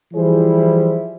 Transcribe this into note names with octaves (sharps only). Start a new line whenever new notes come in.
E3 F3 G3 E4 G#4 C5